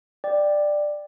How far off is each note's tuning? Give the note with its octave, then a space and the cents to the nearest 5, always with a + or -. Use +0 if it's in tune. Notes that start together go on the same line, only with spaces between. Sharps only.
D5 +10 G5 +0